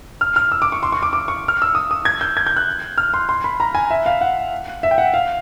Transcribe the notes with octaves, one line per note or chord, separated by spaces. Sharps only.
F6
F6
E6
D6
C#6
C6
C#6
D6
D6
C#6
F6
E6
D#6
D#6
G#6
G6
G#6
G6
F#6
F6
C6
C6
B5
A#5
G#5
E5
F5
F#5
E5
G5
F#5
F5